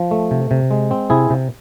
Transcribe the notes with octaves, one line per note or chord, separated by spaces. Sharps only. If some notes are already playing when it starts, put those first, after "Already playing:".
Already playing: F3
A3
C3
C3
G#3
C4
C3 E4 G#4
C3